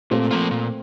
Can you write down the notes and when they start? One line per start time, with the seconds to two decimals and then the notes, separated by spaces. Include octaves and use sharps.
0.11 A#2 A3 C4
0.31 F3 A#3 F4
0.51 A#2